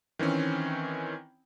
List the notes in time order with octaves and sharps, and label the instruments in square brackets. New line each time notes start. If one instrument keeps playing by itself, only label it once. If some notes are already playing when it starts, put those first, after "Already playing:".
[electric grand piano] D#3 E3 C4 C#4